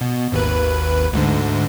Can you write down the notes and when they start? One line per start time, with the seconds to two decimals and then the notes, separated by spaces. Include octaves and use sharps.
0.01 B2
0.32 G#1 D#2 B4
1.13 D2 G#2 D3